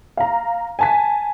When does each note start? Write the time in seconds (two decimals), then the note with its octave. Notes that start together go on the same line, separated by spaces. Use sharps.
0.17 F5 A#5
0.79 G#5 A5 B6